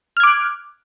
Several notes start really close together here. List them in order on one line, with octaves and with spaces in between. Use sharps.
F6 G#6 D6 F#6